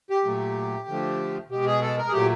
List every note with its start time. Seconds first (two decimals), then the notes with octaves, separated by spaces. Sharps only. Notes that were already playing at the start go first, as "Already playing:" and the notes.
0.10 G4
0.25 A#2 F#3 A3
0.88 D3 F3 A3
1.50 B2 G#3 G4
1.66 G#4
1.82 A4
1.98 A#4
2.08 G#4
2.12 A#2 F#3 A3 G4